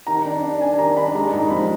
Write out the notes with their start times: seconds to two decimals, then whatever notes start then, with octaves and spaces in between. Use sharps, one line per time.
0.07 D#3 A#5
0.25 D4
0.42 D4
0.61 D4 G#5
0.79 D#3 A#5
0.97 D4 B5
1.15 G#3 A#5
1.33 G#2 A#5
1.50 F3 B5